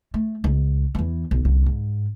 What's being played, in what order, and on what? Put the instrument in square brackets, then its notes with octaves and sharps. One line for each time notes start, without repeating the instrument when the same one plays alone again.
[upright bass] A3
C#2
E2 E3
B1
C2 D3
G#2